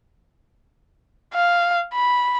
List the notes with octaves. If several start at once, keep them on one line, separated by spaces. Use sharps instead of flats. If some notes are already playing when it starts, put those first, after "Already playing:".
F5
B5